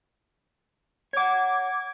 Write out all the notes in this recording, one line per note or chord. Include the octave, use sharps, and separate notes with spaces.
C#5 F#5 D6 G#6